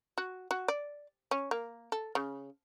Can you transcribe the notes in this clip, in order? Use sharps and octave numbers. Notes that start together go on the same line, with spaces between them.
F#4
F#4
D5
C#4
A#3
A4
C#3